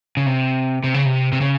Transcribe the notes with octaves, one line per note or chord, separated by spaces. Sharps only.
C#3
C3
C3
C#3
C3
C3
C#3